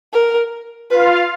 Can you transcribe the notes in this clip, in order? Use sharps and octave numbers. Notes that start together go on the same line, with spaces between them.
A#4
F4 B4 F5